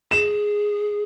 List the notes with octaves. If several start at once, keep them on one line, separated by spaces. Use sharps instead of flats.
G#4 E7